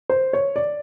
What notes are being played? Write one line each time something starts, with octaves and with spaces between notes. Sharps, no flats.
C5
C#5
D5